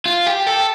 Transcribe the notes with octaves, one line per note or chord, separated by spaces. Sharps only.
F4
G4
A4